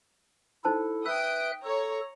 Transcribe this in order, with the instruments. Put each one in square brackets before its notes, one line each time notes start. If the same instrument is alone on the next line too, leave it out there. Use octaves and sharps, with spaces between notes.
[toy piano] D#4 C5 A5 [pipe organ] E4 A4
[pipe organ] B4 E5 F#6 [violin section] G5 D#6 D7 [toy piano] E6
[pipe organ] A4 [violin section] C#5 A#5 C#6